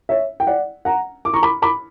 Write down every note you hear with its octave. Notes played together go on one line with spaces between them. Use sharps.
C#5 E5
G5
D5 F#5
F#5 A#5
D6
A#5 C#6
B5 D6
B5 D6